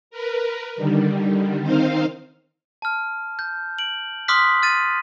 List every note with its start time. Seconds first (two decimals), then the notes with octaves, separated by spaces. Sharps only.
0.11 A#4 B4
0.76 D3 D#3 G3
1.61 D#3 C4 D#4 C5 F5
2.82 A5 F6
3.39 G6
3.79 D7 F#7
4.28 C6 D6 D#6 F6 F#6 B6
4.63 F6 A6 D#7